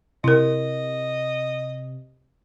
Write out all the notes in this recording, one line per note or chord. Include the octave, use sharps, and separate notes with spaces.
C3 E4 A#4 D#5